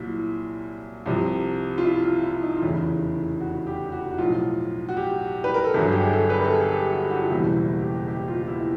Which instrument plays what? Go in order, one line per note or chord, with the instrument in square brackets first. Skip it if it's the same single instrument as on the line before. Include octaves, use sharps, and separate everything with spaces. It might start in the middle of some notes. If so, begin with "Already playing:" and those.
Already playing: [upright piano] C2 A#2 F#3 E4
C2 C3 F3
F4
E4
F4
E4
D#4
F4
F1 E2 C#3 E4
F#4
G4
G4
F#4
F#4
B1 A2 F3 F4
F#4
G4
B4
A#4
A4
G1 G2 D3 F#3 G#4
G4
G#4
A4
B4
A#4
A4
G#4
G4
F#4
F#4
F4
F#1 E2 B2 G3 E4
E4
G4
G4
F4
E4